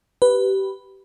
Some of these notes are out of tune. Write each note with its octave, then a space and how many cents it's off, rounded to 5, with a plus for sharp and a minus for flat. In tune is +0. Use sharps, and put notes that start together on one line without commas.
G4 -20 B4 +0